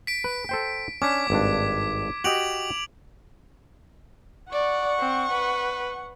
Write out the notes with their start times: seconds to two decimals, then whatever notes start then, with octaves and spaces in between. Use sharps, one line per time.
0.07 B6 D7
0.24 B4
0.49 A4 C5 G5
1.02 C#4 D4 D6 G#6 B6
1.30 G#1 G2 D4
2.24 F#4 G4 D#5 D7 F7 F#7
4.53 D5 F#5 C#6
4.99 C4
5.32 B4